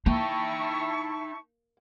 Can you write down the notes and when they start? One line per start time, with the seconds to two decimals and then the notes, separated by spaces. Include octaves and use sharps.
0.06 A#3 D#4 E4 G5 A5 C#6